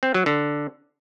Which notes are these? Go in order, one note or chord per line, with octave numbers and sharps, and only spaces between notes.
C4
F#3
D3